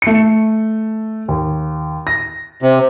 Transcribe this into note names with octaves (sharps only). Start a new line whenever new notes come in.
A3 C#7
D#2
A#6
C3